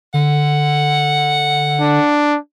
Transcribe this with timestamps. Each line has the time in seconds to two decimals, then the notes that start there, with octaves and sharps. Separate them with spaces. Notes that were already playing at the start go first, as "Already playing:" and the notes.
0.14 D3 F#5
1.81 D4